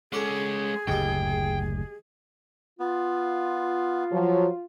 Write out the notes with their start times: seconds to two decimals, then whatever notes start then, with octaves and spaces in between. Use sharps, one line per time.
0.12 G#3 C#4 G#4 A4 D5 F#5
0.87 F#1 D2 A2 G#3 G4 G5
2.80 B3 F4
4.12 F3 F#3